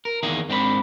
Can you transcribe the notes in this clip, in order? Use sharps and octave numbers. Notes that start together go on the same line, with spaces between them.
A#4
E2 D#3 A#3 G#4
G#2 C4 D4 G#4 B5